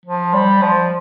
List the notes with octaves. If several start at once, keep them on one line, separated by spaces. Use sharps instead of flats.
F3
G3
F3